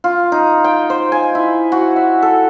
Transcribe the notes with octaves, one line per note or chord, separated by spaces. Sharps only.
F4
D#4
G5
C5
G#5
E4
F#4
E5
A4